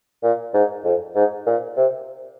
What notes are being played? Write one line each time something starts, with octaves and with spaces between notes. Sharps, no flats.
A#2
G#2
F2
G#2
A#2
C3